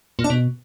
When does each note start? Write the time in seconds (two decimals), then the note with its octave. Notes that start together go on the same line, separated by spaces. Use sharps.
0.19 A#2
0.24 D4
0.30 B2